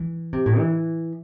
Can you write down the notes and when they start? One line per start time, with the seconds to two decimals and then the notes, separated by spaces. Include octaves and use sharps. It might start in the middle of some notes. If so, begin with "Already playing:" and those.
Already playing: E3
0.33 C3
0.46 A2
0.58 E3